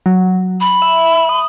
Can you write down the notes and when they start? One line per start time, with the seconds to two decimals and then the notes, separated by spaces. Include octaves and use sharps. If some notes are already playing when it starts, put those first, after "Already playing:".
0.06 F#3
0.60 B5
0.82 E5
1.29 D#6